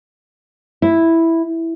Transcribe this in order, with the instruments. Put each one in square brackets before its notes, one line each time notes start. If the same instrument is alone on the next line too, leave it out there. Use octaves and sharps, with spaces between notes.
[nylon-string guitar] E4